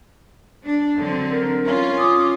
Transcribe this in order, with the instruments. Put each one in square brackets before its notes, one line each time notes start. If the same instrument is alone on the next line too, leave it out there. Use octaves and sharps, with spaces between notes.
[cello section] D4
D3 F#3 C4
[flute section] A#4
[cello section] C#4 F4
[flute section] D6 D#6